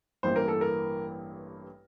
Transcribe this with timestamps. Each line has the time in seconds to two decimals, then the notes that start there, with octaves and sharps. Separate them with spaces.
0.23 A1 G2 E3 A#3 E4 C5
0.36 A#4
0.48 A4
0.61 A#4